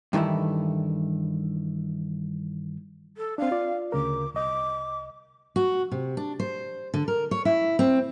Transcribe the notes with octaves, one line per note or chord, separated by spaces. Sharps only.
G2 D#3 E3 A3 E4
A4
C4 D4 F5
F4 D5
D2 C#3 A#4 D6
C2 D#5 D6
F#4
C3
D4
C5
D3
A#4
C#5
E4
C4